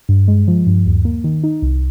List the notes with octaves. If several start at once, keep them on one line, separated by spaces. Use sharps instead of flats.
G2
G#3
F3
G2
D#2
A#3
D#3
D#4
C2